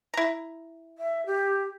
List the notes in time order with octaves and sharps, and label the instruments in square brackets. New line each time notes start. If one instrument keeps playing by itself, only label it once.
[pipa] E4 A#5
[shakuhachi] E5
G4